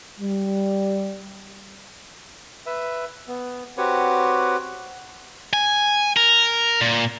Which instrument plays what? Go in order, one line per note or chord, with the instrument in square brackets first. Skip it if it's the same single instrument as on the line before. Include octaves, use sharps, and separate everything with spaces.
[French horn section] G3
[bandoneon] B4 E5
B3
C4 F#4 G4 B4 C#5 F#5
[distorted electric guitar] G#5
A#4
A#2